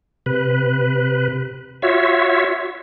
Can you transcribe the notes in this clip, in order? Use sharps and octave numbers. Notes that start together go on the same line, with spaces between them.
C3 B4
F4 F#4 C#5 E5